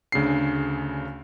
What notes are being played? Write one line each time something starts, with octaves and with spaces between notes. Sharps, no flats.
D2 C#3 D4 C7